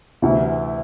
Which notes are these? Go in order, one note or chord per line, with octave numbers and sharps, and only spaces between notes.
D2 C3 E3